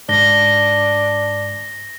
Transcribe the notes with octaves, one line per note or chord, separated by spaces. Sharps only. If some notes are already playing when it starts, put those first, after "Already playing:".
G#2 D4 A#6 G7